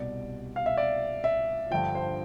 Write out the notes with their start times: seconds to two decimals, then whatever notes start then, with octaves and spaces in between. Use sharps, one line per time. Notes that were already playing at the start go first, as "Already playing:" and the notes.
Already playing: C2 B2 G3 D5
0.56 F5
0.66 E5
0.77 D5
1.24 E5
1.71 G2 D3 F3 G5
1.95 C5